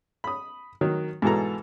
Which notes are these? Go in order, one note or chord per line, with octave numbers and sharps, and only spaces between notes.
B5 D#6
D#3 F#3
G#2 B2 E3 A4 A#5